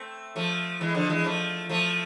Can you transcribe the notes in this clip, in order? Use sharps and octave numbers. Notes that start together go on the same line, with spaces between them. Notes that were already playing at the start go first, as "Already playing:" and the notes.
Already playing: A3 C4
F3 A3
E3 G#3
D3 F3
E3 G#3
F3 A3
F3 A3